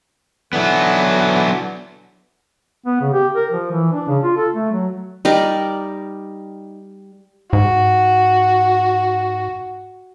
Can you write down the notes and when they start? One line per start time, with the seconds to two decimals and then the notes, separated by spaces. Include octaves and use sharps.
0.53 D3 E3 F#3 B3
2.86 B3
3.01 C#3
3.13 G4
3.36 A#4
3.51 F3
3.72 E3
3.93 D4
4.08 C#3
4.24 F4
4.37 A4
4.54 A3
4.72 F#3
5.25 G3 D#4 A#4 D5
7.53 G#2 F#4